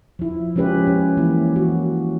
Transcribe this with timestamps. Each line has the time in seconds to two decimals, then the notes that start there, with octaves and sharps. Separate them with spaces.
0.19 F3 E4
0.56 F3 G#3 C#4 G4 B4
0.87 C#4
1.17 E3 A#3 E4
1.56 F#4